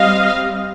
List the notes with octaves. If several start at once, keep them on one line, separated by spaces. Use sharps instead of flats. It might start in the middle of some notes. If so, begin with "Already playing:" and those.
Already playing: G3 C4 D#5 F5